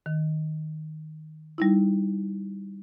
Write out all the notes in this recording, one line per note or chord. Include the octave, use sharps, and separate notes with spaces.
D#3
G3 D#4 E4